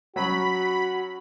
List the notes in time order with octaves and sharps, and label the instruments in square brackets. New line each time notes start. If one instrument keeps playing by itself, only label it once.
[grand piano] F#3 C#4 [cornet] F#4 [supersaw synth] B5